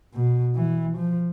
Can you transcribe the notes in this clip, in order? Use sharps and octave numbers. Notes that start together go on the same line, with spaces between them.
B2
E3
F3